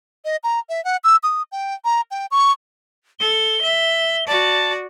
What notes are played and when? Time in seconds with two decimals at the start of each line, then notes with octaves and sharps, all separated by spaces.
0.25 D#5
0.44 A#5
0.69 E5
0.85 F#5
1.04 E6
1.23 D#6
1.52 G5
1.85 A#5
2.11 G5
2.31 C#6
3.20 A4 G7
3.62 E5
4.27 F#4 D5 A5